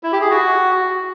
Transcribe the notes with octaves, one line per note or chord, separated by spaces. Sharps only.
E4
G4
G#4
F#4